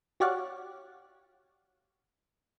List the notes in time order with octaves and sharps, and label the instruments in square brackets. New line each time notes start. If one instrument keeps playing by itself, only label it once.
[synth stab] F#4 G4 C#5 D5 F5 F#5